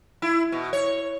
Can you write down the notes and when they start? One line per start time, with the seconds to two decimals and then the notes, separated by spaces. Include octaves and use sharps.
0.22 E4
0.52 B2
0.73 C#5